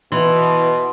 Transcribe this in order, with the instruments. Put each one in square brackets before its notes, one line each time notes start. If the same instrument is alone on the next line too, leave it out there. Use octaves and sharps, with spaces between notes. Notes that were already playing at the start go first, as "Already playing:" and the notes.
[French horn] B2 [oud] E3 [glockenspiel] C6